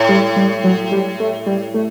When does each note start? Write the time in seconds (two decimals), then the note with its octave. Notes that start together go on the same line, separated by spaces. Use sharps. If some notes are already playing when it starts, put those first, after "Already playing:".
Already playing: A2
0.09 G3
0.36 G3
0.64 F#3
0.92 G3
1.20 A3
1.46 G3
1.74 A3